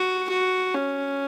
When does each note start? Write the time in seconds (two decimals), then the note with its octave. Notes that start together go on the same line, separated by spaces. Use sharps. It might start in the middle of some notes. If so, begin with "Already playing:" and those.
Already playing: F#4
0.29 F#4
0.75 C#4